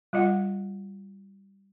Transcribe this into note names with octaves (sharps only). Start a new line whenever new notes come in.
G3 F4 D#5 F#5